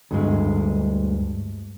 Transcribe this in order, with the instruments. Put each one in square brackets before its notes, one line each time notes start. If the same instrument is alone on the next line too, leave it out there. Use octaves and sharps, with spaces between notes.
[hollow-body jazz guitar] D2 G2 G#3